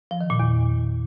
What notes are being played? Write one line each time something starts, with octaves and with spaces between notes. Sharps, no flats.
F3
D#3
A#2
E2